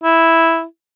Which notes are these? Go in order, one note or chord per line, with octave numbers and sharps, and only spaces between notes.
E4